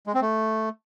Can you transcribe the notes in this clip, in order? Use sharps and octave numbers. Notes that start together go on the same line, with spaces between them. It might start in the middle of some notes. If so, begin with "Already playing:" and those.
G#3
C4
A3